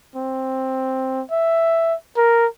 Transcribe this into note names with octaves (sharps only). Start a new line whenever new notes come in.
C4
E5
A#4